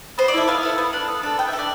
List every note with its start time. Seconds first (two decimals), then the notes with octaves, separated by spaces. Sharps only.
0.18 B3 C5
0.28 D5
0.34 E4 A4 E5
0.48 B3 F5
0.63 E4 A4
0.78 B3
0.93 D4 A4
1.08 B3
1.23 D4 A4
1.38 B3 G5
1.49 A4 E5
1.58 D4 D5